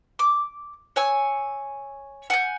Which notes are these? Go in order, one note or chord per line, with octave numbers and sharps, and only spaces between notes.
D6
C#5 G#5 E6
F#5 G#5 G6